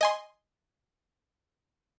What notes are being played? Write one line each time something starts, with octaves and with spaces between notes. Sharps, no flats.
D#5 G#5 C6